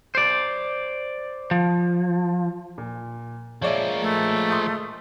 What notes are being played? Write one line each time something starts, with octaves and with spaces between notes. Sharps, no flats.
C5 D5
F3
A#2
F3 G#3 A#3 C#5 D5 E5
A3
C6 D#6